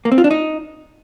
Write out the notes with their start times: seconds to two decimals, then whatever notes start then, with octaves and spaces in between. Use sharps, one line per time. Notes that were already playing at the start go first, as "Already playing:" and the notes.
0.05 A#3
0.12 C4
0.18 F4
0.24 D4
0.31 D#4